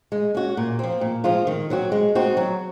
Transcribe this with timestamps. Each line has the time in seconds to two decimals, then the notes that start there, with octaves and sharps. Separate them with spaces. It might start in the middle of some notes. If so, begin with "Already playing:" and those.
0.12 G#3
0.35 C#4 F#4
0.57 A#2
0.79 F3 C4
1.01 A#2
1.24 F3 G#3 C4 F4
1.47 D#3
1.70 F#3 C4 F#4
1.92 G#3
2.15 C4 D#4 F#4
2.37 F#3